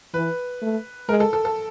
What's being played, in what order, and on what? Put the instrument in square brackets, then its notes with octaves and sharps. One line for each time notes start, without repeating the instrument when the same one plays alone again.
[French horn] E3 [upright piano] B4
[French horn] A3
[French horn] G#3 [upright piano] A#4
[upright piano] A4
A4
A4